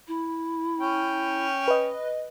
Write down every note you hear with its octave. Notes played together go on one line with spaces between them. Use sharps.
E4
C#4 G5
B4 D#5